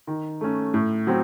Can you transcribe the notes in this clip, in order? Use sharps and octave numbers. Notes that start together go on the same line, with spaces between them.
D#3
A3 C#4
A2
F#3 C4